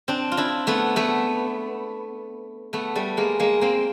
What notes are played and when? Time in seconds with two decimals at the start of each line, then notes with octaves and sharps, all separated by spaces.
0.08 C4 D4
0.32 F4
0.37 D4 E4
0.67 A3 B3
0.96 A3 B3
2.73 A3 B3
2.95 G3 A3
3.17 G#3 A#3
3.39 G#3 A#3
3.61 A#3 C4